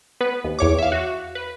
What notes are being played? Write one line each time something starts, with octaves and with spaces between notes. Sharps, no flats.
B3 B4
D#2
E2 C#5 D6
E5 F5
F#4
B4